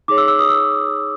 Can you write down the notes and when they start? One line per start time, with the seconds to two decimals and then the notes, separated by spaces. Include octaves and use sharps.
0.08 D#4 G#4 C#5 D6
0.18 E6
0.28 E6
0.39 D#6
0.49 E6